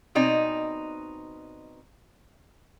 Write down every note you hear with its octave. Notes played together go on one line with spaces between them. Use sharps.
B2 C4 D#4 D5 G#5